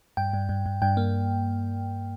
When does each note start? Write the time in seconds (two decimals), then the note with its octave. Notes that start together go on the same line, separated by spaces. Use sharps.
0.17 G2 G5
0.33 G2
0.49 G2
0.66 G2
0.82 G2 G5
0.97 A#3